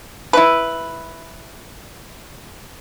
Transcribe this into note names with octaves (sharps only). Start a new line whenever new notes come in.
E4 B4